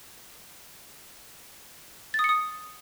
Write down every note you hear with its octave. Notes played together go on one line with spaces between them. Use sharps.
A6
D#6
C#7
D#6